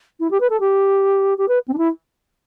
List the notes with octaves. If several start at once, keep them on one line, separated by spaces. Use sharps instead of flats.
E4
G4
B4
A4
G4
G4
B4
C4
D4
E4